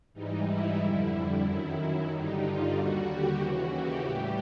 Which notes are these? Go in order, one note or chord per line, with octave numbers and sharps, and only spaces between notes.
G#2 E3 G3 D#4
E4
F2 D3 G3 E4
F#2 D#3 F#3
G2 D3 G3 D#4
F4
D#2 D3 G3 F#4
G4
D#2 C#3 E3 F#4
G4
A2 E3 G3 G4